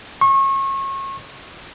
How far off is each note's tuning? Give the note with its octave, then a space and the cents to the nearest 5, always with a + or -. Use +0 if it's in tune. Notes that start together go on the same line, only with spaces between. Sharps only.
C#6 -30